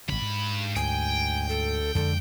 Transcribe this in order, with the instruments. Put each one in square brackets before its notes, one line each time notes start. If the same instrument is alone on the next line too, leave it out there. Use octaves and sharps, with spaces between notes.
[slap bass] A1 C3 [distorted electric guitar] G2 B5
[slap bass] G#2
[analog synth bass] D2 [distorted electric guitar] G5 [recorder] G#5
[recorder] A4
[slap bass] F2 G#3 [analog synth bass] D3 [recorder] A4